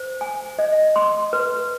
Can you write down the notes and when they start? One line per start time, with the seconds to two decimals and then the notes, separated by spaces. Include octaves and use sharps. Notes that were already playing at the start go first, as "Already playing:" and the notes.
Already playing: C5
0.21 G#5
0.59 D#5
0.96 C6
1.33 B4